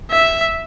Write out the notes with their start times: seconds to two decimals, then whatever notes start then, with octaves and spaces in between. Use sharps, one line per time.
0.12 E5